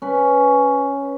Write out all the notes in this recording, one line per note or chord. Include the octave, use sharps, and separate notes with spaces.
C#4 B4